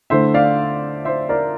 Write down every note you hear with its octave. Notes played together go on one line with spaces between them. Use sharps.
D3 A3 E4 C5 E5
D5 F5
C5 E5
A#4 D5